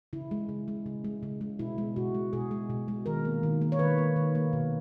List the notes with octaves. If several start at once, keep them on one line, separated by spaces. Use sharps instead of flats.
C#3 E4
G#3
C#3
G#3
C#3
G#3
C#3
G#3
B2 E4
G#3
B2 F#4
G#3
B2 G#4
G#3
B2
G#3
D#3 A#4
A#3
D#3
A#3
C#5
D#3 B4
A#3
D#3
A#3
B2